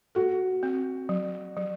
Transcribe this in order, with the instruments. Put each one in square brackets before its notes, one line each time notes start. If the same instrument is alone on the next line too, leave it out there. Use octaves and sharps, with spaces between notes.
[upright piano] F#4 [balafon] A4
[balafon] C4
F#3
F#3